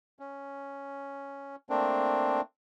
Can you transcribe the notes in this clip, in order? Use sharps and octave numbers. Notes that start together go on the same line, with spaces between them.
C#4
A3 A#3 C4 D4